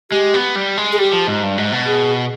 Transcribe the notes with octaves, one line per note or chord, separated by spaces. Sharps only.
G#3 G4
B3
G3
G#3
G#4
G3 G4
F3
G#2
G2
G#2
B2
G#4